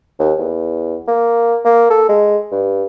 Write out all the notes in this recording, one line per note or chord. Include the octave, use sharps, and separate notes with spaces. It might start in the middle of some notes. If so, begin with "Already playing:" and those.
D#2
E2
A#3
A#3
A4
G#3
G2